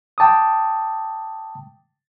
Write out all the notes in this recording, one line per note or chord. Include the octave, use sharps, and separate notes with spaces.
G5 A5 D6 D#6